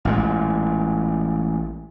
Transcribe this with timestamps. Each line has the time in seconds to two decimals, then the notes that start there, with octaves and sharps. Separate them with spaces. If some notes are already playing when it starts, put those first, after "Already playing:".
0.05 A1 A#2 G#3